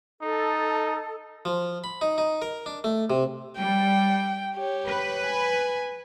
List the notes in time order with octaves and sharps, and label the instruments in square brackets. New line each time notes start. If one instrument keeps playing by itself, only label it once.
[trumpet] D#4 [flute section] A4
[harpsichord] F3
B5
D#4
D#4
A#4
D4
A3
C3
[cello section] G3 [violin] G5
[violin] G4 C#5
[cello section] B4
[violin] G#5